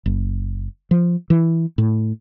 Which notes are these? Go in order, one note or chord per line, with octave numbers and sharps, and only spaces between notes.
F#1
F3
E3
A2